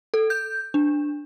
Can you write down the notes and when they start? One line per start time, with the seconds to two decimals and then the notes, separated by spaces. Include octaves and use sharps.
0.14 A4
0.30 G6
0.74 D4